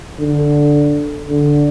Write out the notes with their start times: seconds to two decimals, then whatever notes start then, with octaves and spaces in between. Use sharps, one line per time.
0.21 D3
1.29 D3